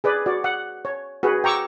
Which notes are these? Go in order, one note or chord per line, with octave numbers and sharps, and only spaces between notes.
G#4 B4 D5
F#4 D5
F#5
C#5
F#4 G#4 B4
G5 A#5 C#6 D6 E6